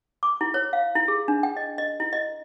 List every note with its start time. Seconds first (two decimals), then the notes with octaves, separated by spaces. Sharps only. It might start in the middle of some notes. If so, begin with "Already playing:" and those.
0.23 D6
0.41 E4
0.54 C#5
0.73 F5
0.96 E4
1.08 G#4
1.28 D4
1.43 G5
1.57 D#5
1.78 D#5
2.00 E4
2.13 D#5